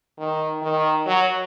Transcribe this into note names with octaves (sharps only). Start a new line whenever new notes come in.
D#3
D#3
F#3